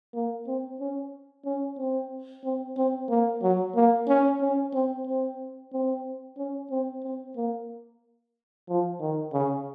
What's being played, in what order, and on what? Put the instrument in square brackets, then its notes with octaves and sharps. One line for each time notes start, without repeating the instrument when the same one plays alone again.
[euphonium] A#3
C4
C#4
C#4
C4
C4
C4
A#3
F#3
A#3
C#4
C#4
C4
C4
C4
C#4
C4
C4
A#3
F3
D#3
C#3